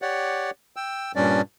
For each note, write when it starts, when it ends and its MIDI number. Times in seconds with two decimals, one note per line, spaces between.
0.02 0.50 67
0.02 0.50 73
0.02 0.50 74
0.02 0.50 78
0.76 1.12 79
0.76 1.12 88
1.16 1.41 43
1.16 1.41 46
1.16 1.41 55
1.16 1.41 61
1.16 1.41 62
1.16 1.41 74